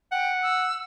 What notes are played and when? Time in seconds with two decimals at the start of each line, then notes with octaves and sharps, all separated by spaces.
0.12 F#5 G5
0.43 E6